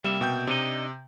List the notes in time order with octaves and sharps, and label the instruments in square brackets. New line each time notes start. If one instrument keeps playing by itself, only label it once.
[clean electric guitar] C3 A#3 E5 [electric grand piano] G3
[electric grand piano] B2 G5 G6
[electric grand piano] C3 [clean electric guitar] D4 D#4 D#5